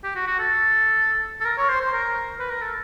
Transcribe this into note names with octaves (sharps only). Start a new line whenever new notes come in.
G4
F#4
F#4
A4
A4
A#4
C#5
C5
C5
A#4
B4
A#4
A4